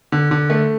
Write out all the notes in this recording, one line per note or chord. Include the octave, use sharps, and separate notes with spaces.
D3
D3
A3